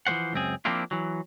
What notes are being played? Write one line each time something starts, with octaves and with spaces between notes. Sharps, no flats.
E3 F3 A3 C5 F#5
C#2 F#2 C4 G#4
F3 A#3 C4 D4 E4 F4
E3 F#3